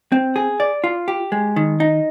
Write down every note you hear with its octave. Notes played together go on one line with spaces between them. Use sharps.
C4
G#4
D5
F4
G4
G#3
D#3
D#4